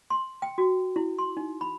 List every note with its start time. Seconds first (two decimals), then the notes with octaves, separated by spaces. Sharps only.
0.10 C6
0.42 G5
0.58 F#4
0.96 E4
1.18 C6
1.37 D#4
1.61 B5